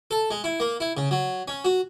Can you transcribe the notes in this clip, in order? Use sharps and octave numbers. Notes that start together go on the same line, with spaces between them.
A4
G#3
E4
A#3
E4
C#3
F#3
C#4
F#4